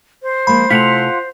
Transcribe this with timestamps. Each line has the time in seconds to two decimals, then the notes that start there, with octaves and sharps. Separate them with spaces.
0.23 C5
0.47 F3 G#3 A#3 B5
0.70 C3 A3 E4 F4 F#5 B6 F7